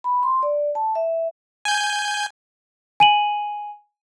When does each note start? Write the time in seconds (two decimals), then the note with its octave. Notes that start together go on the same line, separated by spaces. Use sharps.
0.04 B5
0.23 C6
0.43 D5
0.75 A5
0.95 E5
1.65 G#5 G6
3.00 G#5 D#7 F#7